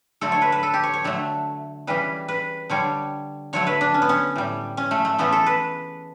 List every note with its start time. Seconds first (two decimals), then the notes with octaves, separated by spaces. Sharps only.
0.21 D3 F#3 A3 A4
0.32 C#5
0.42 B4
0.52 B4
0.63 A4
0.74 G4
0.83 C#5
0.94 C#5
1.04 D3 F#3 A3
1.87 C#3 E3 G3 B4
2.28 B4
2.70 D3 G3 C#5
3.53 D3 F#3 A3 C#5
3.67 B4
3.81 D4
3.94 C#4
4.02 B3
4.09 C#4
4.36 A2 G3
4.77 C#4
4.91 A3
5.05 A3
5.19 C#3 E3 A3 B3
5.32 A4
5.46 B4